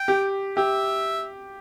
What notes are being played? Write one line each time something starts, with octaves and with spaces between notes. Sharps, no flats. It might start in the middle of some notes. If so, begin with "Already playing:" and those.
Already playing: G5
G4
G4 E5